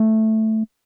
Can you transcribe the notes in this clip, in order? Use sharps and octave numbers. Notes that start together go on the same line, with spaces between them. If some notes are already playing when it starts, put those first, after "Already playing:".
Already playing: A3